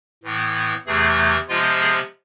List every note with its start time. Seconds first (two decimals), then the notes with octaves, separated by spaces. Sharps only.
0.23 A2 E3 B3
0.86 E2 C3 E3 A3 G#4
1.49 C3 F3 G#3 B3 F4
1.80 G#4